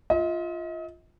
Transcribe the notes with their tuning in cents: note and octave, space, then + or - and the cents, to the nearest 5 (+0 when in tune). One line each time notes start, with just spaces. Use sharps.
F4 -5 D#5 +40